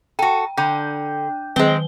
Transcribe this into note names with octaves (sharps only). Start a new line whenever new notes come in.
F#4 A4 G5
D3 G5 G6
D#3 G#3 C4 G7